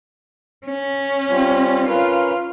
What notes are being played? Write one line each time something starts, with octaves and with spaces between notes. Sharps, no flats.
C#4
G3 C4 F4
C#4 F4 A#4 B4